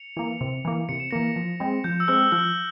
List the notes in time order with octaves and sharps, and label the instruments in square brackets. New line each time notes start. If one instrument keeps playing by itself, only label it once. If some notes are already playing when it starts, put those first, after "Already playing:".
Already playing: [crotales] C#7 F7
[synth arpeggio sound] E3 A#3
C3
E3 A#3
[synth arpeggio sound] C3 [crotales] C#7
[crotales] E7
[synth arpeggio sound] E3 A#3 [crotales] A#6 C#7
[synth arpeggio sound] F3
G#3 C4
[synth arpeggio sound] F3 [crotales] G6
[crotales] E6
[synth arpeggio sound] G#3 C4 [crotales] F6
[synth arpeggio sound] F3 [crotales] F6